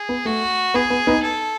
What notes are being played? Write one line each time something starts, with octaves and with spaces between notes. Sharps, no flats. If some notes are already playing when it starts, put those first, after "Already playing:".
Already playing: G#4
B3
A3 F#4
B3 G#4
B3
B3 D#4
A4